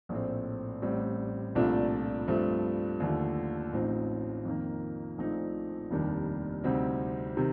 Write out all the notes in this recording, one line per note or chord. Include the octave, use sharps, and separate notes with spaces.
A#1 A2 A3 C4
A1 A2 G3 C4
C2 A#2 F3 A3 D4
G2 F3 A3 C4
D#2 D3 F3 A3
A1 A2 F3 C4 D#4
F2 D#3 A#3
A#1 A#2 A3 C4 D#4
F1 D#2 D#3 G3 D4
D2 C3 G3 C4 D#4
C3 D#3